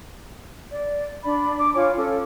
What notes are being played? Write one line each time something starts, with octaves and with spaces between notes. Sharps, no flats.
D5
D4 D5 B5
D6
F4 C#5 G#5 D6
C#4 A4